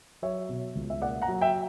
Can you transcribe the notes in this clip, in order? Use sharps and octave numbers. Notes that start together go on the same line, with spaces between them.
F#3 C#5 E5
B2
C#2
E5
A#3 D5 F#5
F#5 A#5
F#3
E5 G5